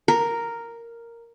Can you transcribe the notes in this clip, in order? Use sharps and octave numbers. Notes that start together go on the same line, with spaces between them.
A#4